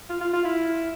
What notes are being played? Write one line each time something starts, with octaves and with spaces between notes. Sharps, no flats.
F4
F4
F4
E4